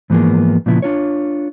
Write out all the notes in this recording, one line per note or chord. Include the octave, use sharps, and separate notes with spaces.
G#2 E3 F3 A#3 B3 G#4
A#2 C#3 F3 B3 E4
D4 F4 C#5